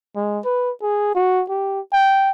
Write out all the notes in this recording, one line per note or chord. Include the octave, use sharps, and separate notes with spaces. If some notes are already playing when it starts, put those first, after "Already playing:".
G#3
B4
G#4
F#4
G4
G5